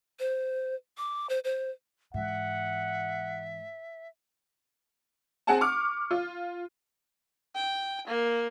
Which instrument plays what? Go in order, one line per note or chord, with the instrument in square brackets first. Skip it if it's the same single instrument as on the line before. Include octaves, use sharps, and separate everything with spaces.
[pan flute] C5
D6
C5
C5
[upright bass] G#2 E3 [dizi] E5 [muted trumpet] F#5
[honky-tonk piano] C4 G#4 F#5 G#5 A5
C#6 D6 F6
F4
[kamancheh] G5
A#3